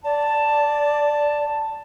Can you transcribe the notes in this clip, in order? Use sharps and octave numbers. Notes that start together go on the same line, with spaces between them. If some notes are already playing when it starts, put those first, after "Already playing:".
D5 A5